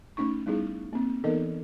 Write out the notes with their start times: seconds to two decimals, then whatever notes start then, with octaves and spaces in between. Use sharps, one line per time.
0.17 A3 C#4 D#4 C#6
0.46 G3 B3 D#4 E4 G#4
0.93 A#3 C4
1.24 E3 B3 D#4 A4 A#4 D#5